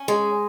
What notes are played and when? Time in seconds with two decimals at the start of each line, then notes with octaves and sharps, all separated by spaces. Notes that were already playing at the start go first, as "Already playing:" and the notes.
Already playing: C#4
0.08 G#3